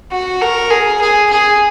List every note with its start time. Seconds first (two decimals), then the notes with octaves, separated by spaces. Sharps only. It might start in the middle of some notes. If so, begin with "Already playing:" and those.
0.11 F#4
0.41 A#4
0.71 G#4
1.01 G#4
1.31 G#4